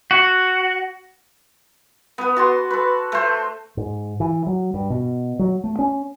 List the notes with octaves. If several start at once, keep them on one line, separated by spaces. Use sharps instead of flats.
F#4
B3 B4
F#4 A5 C6
A4 B4
A3 C5
G#2
E3
F#3
G2
B2
F#3
A3
C#4